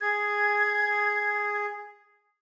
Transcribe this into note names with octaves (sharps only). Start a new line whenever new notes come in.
G#4 G#6